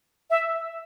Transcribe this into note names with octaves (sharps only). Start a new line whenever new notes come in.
E5